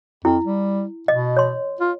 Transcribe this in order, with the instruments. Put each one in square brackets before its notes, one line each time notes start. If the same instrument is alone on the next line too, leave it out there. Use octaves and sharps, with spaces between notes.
[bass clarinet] F2 [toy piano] E4
[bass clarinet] G3
[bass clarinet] B2 [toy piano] D#5
[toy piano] C#5 C6
[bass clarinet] F4